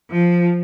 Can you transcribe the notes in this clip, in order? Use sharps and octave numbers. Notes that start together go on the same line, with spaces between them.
F3